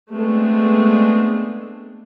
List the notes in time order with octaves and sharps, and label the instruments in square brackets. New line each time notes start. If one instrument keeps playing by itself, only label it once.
[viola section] G#3 A3 B3 C4 D4